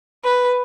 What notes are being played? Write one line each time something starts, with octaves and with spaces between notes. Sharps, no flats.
B4